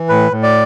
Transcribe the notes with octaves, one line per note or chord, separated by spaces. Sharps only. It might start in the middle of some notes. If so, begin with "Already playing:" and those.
Already playing: E3
A2 B4
A2
D5